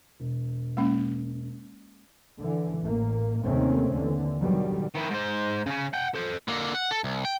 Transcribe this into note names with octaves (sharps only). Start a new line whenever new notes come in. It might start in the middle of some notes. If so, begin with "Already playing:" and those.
E1
G#3 A#3 C#4
D3 E3
A1 A#3
D#2 C3 D#3 A3 C4 C#4
D#2 D3 E3
B2 D3 D#3 F#3 G3
D#3 E4
G#2 C5
C#3 C#4
F#5 G5
A4 C5
D3 A#3
F#5
A4
C2
G5